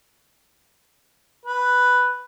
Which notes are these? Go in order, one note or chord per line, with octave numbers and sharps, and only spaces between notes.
B4